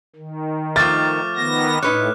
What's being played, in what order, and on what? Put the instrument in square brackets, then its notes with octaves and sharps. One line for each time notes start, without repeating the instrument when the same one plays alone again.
[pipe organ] D#3
[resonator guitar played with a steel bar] F3 A3 [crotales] C#6 D6 F6 [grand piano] A6
[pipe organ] D#3 B3 A#6
[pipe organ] A2 [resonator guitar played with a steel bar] D#4 B4 C#5 [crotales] F#6